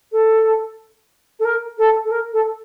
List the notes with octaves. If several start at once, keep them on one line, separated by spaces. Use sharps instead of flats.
A4
A4
A#4
A4
A4
A#4
A4